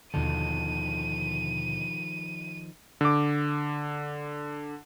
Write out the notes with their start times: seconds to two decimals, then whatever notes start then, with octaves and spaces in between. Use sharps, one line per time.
0.14 D#2 B2 D3 D#3 F3 A4 D#7
3.01 D3 D6